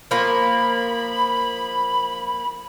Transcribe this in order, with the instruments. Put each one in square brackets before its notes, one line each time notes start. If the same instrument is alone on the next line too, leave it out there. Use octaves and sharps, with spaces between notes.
[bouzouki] F3 A#3 [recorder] B5